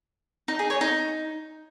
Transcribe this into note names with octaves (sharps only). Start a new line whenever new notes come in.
D#4
G#4
C#5
D#4